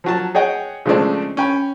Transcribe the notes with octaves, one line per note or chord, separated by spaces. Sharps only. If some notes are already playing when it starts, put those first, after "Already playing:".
F3 F#3 A5
G#4 C#5 D#5 F#5 G5
C#3 F3 G#3 A3 C4 D4
C#4 G5 B5